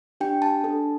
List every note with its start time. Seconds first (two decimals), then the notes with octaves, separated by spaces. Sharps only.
0.20 D4 G4 G5
0.42 A5
0.64 D4 A4